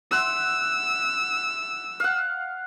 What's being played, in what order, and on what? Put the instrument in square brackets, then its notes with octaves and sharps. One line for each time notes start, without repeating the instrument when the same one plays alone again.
[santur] E5 F#5 C6 [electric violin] E6
[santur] F5 F#5